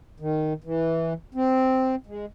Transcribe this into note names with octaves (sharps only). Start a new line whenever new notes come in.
D#3
E3
C4
G#3